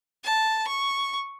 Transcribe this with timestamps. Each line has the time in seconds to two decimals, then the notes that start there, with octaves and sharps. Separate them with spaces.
0.24 A5
0.67 C#6